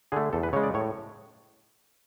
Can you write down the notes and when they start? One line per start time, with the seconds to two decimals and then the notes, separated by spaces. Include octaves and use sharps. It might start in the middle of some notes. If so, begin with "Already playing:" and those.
0.12 D3 A3 G#4
0.33 E2 A4
0.43 B4
0.53 C#3 G#3 C#5
0.63 D5
0.74 A2 C#5